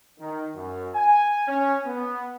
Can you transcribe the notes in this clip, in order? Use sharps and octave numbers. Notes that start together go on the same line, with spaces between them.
D#3
F#2
G#5
C#4
B3